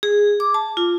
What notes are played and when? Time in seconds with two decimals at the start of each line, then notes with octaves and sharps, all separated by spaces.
0.03 G#4
0.40 D6
0.54 A5
0.77 F4